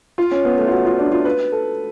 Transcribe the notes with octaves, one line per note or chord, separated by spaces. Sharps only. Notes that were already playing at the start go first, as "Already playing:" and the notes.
F4
C#4
B3
A3
F4
F#4
F4
D4
F4
B4
A4